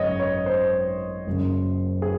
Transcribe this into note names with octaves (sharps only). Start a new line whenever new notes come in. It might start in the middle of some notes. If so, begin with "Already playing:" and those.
Already playing: G#1 F#2 C#3 C#5 D#5
C#5
C5
F#1 F#2 C#3
G#4